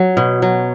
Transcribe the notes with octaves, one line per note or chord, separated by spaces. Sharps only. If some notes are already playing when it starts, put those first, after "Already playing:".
Already playing: F#3
B2
F#3